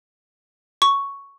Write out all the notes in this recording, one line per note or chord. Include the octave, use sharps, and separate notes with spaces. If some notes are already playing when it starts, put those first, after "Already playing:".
C#6